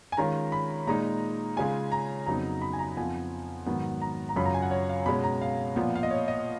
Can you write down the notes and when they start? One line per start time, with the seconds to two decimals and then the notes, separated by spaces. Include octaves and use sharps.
0.12 G#5
0.17 D#3 G#3 C#4 F4 A#5
0.52 B5
0.87 A#2 G#3 D#4 A#5
1.57 C#3 G#3 C#4 F4 G#5
1.92 A#5
2.26 F2 C#3 F#3 B3 D#4 A#5
2.62 B5
2.73 G#5
2.79 A#5
2.97 F2 F3 B3 G#5
3.66 G#2 D#3 F#3 B3
4.01 A#5
4.29 A#5
4.36 F#2 C#3 F#3 C#4 F4 B5
4.46 A#5
4.54 G#5
4.62 F#5
4.71 C#5
4.89 F5
5.06 B2 G#3 C#4 B5
5.24 A#5
5.41 F5
5.76 A#2 F3 B3 F4
5.95 F5
6.03 D#5
6.11 C#5
6.28 D#5